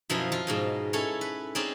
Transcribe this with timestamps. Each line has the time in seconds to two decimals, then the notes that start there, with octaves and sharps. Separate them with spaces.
0.10 F#2 B2 F3 E4 F4 D#5
0.32 F3 F4
0.47 G#2 B2 D#5
0.93 C#4 E4 A4 C#5
1.21 B4
1.55 C4 C#4 D#4 G#4 D5